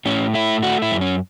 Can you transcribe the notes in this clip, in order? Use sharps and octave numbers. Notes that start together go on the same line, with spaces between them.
A2 C#4
A3 E4
A3 F#4
E4
F#2
C#4